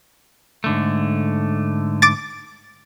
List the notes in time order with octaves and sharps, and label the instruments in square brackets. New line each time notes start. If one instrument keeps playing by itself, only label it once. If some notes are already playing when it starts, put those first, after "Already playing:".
[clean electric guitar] G#2 D3 A3
[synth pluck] D6 A6